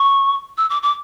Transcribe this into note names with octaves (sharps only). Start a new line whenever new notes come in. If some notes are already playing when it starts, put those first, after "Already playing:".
Already playing: C#6
E6
D6
D6